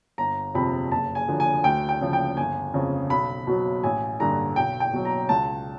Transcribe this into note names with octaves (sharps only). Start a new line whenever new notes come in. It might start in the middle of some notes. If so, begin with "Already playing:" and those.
G1 A#5
F2 C3 F3 B5
F#1 A5
G#5
F#2 D3 F3
G#5
D2 G5
G5
C#3 F3
G5
G1 G#5
F2 C#3
B1 B5
B2 F#3
A1 G#5
G2 D3 A#5
B1 G5
G5
B2 F#3
A#5
C#2 A5